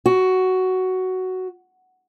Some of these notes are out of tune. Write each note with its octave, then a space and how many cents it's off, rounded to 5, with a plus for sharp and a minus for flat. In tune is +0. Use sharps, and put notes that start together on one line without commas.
F#4 +10